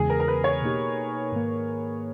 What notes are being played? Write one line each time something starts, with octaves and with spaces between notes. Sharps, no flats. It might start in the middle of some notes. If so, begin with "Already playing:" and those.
Already playing: E2 C#3 E3 G#3 B3 G#4
A#4
A#4
B4
C#5
B2 A#3 D#4 G4
G#2 D#3 A#3